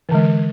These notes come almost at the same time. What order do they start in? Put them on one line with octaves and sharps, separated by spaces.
E3 D3 G#3